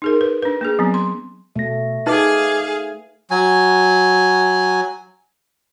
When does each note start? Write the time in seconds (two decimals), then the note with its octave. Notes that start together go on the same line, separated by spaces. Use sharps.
0.02 D#4 G#4 A#4
0.21 B4
0.42 D4 B4
0.61 A#3 D4 G#4
0.79 F#3 B3 C4
0.94 C6
1.56 B2 A3 A#6
2.07 D#4 G#4 B4 D#5 F5 D6
3.31 F#3 G#5